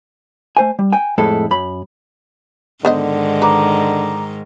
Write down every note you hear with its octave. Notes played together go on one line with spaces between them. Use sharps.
A3 C5 G#5
G3
G5 G#5
F2 A2 G#3 E4 A4
F#2 B5
G#2 D3 D#3 B3 C5 D#5
B4 A#5 D6